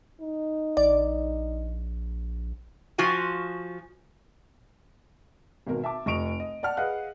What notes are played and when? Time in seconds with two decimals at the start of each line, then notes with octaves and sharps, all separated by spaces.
0.21 D#4
0.77 A#1 D5
2.98 F3 F4 F#4 G#5
5.67 G#1 B2 A#4
5.84 E5 A5 D6
6.06 F1 D#5 C#6 D7 F7
6.40 D#5
6.63 D5 F#5 A5 F6
6.77 G#4 B4 D#5 F5 F#5 F#6